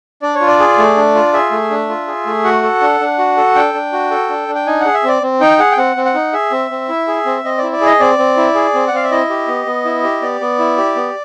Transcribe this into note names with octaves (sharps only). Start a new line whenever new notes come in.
D4 D5
C#5
F4
D5
G#4
A3
D4
F4
G#4 E5
A3
D4
F4
G#4
A3
F#4 F#5
A4
D4
D4
F#4
A4
D4 G5
D4
F#4
A4
D4
D4
G5
D#4 G#5
G#4 F#5
E5
C4 D5
C4
D#4 G5
G#4 F#5
G5
C4 F#5
C4
F#5
D#4
G#4 E5
C4
C4
E4
G#4
C4
C4 D#5
E4 D5
D5
G#4 D#5
C4 D5
C4
E4
G#4
C4
F#5
C4 F5
E5
E4 D#5
G4
B3
B3
E4
G4
B3 D5
B3
E4
G4
B3